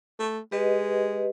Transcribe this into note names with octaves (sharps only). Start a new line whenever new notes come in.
A3
G#3 G4 B4 D#5